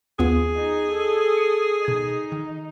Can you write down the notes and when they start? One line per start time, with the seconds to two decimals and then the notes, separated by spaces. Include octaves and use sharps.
0.19 D#2 B3 F4 G#4
0.57 D#4
0.91 A4
1.37 C#7
1.85 B2 D#4 G#6
2.32 D#3